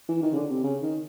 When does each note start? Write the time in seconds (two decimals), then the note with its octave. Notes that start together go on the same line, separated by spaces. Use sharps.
0.09 E3
0.22 D#3
0.32 C#3
0.36 D3
0.50 C3
0.63 C#3
0.82 D#3